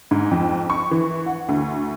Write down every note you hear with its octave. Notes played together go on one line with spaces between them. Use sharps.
G#2
F2
C#6
E3
F#5
D2